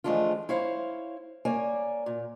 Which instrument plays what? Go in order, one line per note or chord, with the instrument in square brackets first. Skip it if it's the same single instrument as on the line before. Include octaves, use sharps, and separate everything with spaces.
[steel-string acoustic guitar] E3 F3 G#3 A3 D4 F4
E4 C5 C#5 F5
A#3 C#5 D5 G#5
A#2